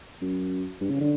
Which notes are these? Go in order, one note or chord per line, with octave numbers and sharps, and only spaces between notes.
F#2
G2
C#3
D3